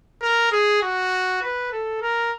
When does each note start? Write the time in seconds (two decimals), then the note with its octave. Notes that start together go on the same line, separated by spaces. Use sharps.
0.21 A#4
0.51 G#4
0.82 F#4
1.42 B4
1.72 A4
2.02 A#4